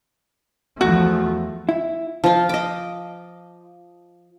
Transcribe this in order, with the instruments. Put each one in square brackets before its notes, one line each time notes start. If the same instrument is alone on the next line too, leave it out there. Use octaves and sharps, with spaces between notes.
[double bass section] E2 F3 A3 [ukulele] F#4
[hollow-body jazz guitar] E4
[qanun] F3 F4
D#5 D6